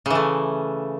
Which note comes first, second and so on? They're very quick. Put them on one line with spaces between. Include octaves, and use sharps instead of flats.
C#3 E3 A3